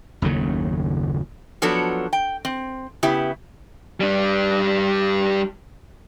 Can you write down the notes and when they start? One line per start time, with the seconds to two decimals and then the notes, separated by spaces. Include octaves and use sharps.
0.22 F#1 D#2 A2 C#3
1.62 F3 F#3 B3 D4 F#4 A4
2.13 G5
2.45 C4
3.03 C#3 B3 E4 G4
4.00 G3 D4